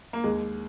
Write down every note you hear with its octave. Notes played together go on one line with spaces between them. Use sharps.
A#3
D#2 G#3